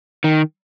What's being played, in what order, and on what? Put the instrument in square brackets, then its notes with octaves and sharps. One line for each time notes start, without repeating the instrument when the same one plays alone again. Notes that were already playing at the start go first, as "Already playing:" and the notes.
[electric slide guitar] D#3